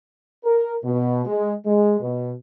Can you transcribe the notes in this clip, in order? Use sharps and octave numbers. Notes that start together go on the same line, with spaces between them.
A#4
B2
G#3
G#3
B2